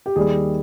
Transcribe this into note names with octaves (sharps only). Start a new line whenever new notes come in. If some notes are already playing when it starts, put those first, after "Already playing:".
G4
D#2 D#3 G3 G#4